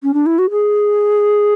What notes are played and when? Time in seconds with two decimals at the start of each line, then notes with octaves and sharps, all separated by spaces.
0.03 C#4
0.14 D4
0.26 E4
0.39 F#4
0.50 G#4